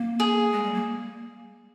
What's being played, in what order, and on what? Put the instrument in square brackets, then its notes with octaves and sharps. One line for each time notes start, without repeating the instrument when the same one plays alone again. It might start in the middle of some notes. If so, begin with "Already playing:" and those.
Already playing: [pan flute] A#3
[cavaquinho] G#4
[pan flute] G#3
G3
A#3